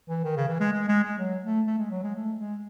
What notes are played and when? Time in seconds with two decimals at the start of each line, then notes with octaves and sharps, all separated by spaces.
0.09 E3
0.24 D#3
0.36 C#3
0.48 E3
0.60 G#3
0.72 G#3
0.88 G#3
1.03 G#3
1.19 F#3
1.44 A3
1.67 A3
1.79 G#3
1.91 F#3
2.03 G#3
2.15 A3
2.39 G#3